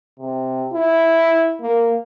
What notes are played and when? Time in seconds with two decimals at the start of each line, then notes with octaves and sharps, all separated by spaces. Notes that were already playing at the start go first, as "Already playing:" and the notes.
0.20 C3
0.73 E4
1.62 A#3